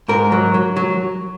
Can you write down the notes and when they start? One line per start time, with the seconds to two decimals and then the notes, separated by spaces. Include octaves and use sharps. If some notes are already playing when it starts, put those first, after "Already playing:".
0.08 G#2 A#4
0.32 F#3
0.54 F#3
0.77 F#3